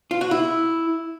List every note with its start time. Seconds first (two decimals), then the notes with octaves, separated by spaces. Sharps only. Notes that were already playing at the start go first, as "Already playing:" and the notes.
0.11 F4
0.21 F#4
0.31 E4